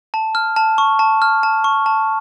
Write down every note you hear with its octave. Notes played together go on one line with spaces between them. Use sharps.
A5
F6
A5
C#6
A5
F6
A5
C#6
A5